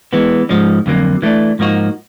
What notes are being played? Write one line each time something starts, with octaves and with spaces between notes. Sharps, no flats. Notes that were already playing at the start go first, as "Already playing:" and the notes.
E3 G#3 B3
G#2 F3 G#3 C#4
F2 D3 F#3 A#3
E3 A3 D4
G#2 F3 A#3 D#4 F#4